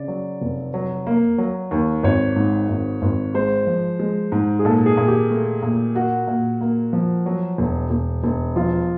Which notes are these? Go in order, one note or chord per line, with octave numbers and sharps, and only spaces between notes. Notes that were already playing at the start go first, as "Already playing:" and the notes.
Already playing: C#3 D5
F#3
F1
F#3
A#3
F#3
D#2
G#1 C#5
G#2
G#1
G#1
G#3 C5
F3
G#3
G#2
G#4
A#2 A4
G#4
A#2
G4
A3
A#2
A#3 F#4
A#2
A#3
F3
F#3
E1
E1
E1
F3 F4